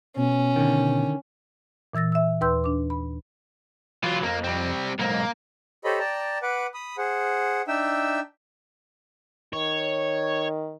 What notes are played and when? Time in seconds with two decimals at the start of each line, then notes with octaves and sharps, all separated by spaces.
0.16 B2 C#4
0.56 D3 D#3
1.93 A#2 E3 E6 A6 A#6
2.12 E5 E6
2.41 D#2 B4 G5 C6 E6 G6
2.64 D4 D6
2.90 B5
4.04 E3 F#3 F4
4.23 F2 A#3
4.44 G3 C4
4.99 B1 G#2 A#3
5.84 G4 A4 C5 C#5 D#5 B5
5.99 D5 G5 A5 A#5
6.42 B4 F#5 D6
6.74 B5 D#6
6.98 G#4 C5 F#5
7.68 D4 D#4 E5 G5 E6
9.53 D#3 C#5